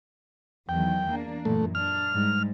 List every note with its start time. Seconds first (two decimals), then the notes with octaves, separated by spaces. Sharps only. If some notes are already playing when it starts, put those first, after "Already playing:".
0.69 E2 D#3 F#3 G5
1.10 A#3 D4
1.45 F#2 A#2 E3 A3
1.75 D4 F6
2.13 G#2 G3